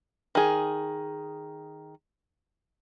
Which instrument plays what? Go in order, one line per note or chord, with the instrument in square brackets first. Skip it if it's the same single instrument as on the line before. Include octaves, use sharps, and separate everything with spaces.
[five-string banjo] D#3 G#4